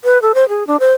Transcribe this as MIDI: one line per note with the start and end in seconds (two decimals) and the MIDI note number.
0.04 0.20 71
0.22 0.32 69
0.35 0.48 72
0.49 0.66 68
0.67 0.77 62
0.80 0.93 72